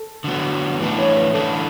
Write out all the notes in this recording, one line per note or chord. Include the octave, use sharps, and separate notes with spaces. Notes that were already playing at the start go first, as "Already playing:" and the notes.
Already playing: A4
D3 F#3 B3
A2 E3 A3 D4 B4
C#5
B4
A2 E3 A3 D4 A4